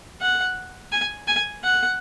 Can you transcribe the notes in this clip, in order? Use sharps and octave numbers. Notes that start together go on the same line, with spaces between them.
F#5
G#5
G#5
F#5